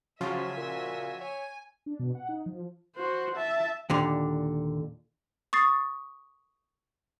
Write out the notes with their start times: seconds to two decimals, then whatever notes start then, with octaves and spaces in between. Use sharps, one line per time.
0.21 C#3 F3 F#3 F4 F#4 E5 G#5
0.57 A#2 F#4
1.21 C#5 G#5
1.86 D4
1.99 B2
2.15 F#5
2.29 D#4
2.46 F3
2.96 F#4 C5
3.36 E5 A5
3.90 D#2 A#2 D3
5.53 C#6 D#6 A6 C7